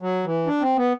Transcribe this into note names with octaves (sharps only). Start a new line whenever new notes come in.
F#3
E3
D4
C4
B3